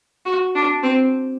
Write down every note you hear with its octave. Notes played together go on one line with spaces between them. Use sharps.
F#4
D4
C4